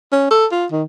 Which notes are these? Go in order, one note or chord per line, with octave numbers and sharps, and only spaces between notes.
C#4
A4
F4
D#3